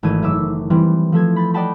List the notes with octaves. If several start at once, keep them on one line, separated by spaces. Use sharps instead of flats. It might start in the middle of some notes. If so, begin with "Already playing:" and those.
G#1 E3 A3 A5 G#6 D#7
F#1 E5 D6 E6
E3 G3 C4
F3 A3 A4 G#6
B5 G6 A6
D5 D#5 F#5 G5 A5 B5